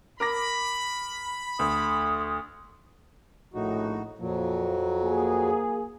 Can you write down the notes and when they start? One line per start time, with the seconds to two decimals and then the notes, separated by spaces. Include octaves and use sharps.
0.20 A#4 B5 D6 A#6
1.59 D2 D#6
3.54 A#1 A2 D#4 F#4
4.19 F2 A#2 F3 F#3
5.04 A#3 G#4